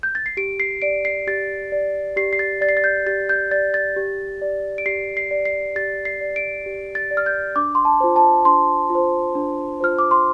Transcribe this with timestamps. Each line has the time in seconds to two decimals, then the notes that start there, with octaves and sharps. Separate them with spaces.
0.03 G6
0.15 A6
0.26 C7
0.37 G4 D7
0.60 C7
0.82 D5 D7
1.05 C7
1.27 G4 A6
1.72 D5
2.16 G4 C7
2.33 C7
2.39 A6
2.61 D5 A6
2.69 C7
2.77 A6
2.84 G6
3.06 G4 A6
3.29 G6
3.51 D5 A6
3.74 A6
3.96 G4
4.42 D5
4.78 D7
4.86 G4 C7
5.17 C7
5.31 D5
5.45 C7
5.75 G4 A6
6.05 C7
6.21 D5
6.36 D7
6.66 G4
6.95 A6
7.11 D5
7.17 F6
7.26 G6
7.56 D4 D6
7.75 C6
7.85 A5
8.00 F4 C5
8.16 A5
8.45 D4 C6
8.90 F4
8.95 C5
9.35 D4
9.80 F4 C5 F6
9.98 D6
10.11 C6